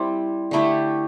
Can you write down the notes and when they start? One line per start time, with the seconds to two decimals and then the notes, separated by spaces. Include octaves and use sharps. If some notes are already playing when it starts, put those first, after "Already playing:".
Already playing: G3 C4 E4
0.51 D3 A3 E4 G4